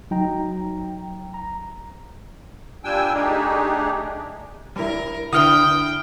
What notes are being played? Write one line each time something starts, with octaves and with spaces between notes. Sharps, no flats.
F#3 D#4 G5 A#5
A#5
A#2 G3 D4 G5 G#5 E6
A3 D4 D#4 G4 G#4
G3 E4 A#4
D3 E4 B4 G5 D#6 F6